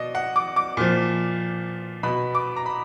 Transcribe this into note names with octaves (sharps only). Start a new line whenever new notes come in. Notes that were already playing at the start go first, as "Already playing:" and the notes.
Already playing: B2 D5 D#5
F#5
D6
D6
A#2 F3
B2 B5
D6
A#5
B5